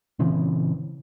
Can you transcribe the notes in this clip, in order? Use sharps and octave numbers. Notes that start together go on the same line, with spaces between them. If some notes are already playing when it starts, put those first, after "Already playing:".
A#2 C#3 E3 C4